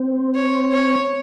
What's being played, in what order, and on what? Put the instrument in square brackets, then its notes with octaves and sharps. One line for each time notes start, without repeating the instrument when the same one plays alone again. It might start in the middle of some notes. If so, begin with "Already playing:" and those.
Already playing: [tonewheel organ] C4
[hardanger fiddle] C#5
C#5